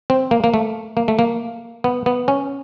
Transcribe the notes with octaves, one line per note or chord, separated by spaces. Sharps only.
C4
A#3
A#3
A3
A#3
A3
A#3
B3
B3
C#4